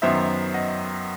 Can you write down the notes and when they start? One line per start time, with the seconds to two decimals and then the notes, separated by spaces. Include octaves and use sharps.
0.02 F#2 D#3 F#3 B3 C5 E5
0.54 D#5 F#5